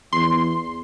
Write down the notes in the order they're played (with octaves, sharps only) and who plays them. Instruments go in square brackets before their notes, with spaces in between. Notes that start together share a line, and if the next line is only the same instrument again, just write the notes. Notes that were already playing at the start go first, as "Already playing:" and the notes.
[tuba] E2 [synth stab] C6